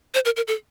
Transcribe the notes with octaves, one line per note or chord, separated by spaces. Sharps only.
C5
A#4
A#4
A4